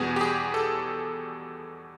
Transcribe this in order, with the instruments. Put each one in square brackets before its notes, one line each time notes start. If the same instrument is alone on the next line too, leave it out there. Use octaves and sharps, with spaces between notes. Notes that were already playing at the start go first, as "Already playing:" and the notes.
Already playing: [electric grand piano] E2 B2 G3 B3 G#4
G4
G#4
A4